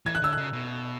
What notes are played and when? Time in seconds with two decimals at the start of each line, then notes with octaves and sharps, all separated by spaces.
0.06 E3 G#6
0.15 F#6
0.22 D3 E6
0.33 C#3 F#6
0.53 B2